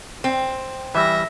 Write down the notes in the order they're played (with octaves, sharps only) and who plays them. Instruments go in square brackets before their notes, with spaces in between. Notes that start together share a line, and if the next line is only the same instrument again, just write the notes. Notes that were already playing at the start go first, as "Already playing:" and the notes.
[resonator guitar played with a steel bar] C4
[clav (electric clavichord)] E3 G3 [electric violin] E5 A#6